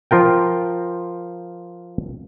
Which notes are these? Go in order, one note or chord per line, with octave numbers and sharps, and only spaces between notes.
F3 F4 A#4 G5